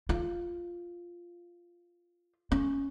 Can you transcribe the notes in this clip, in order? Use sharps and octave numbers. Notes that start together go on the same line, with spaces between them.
F4
C#4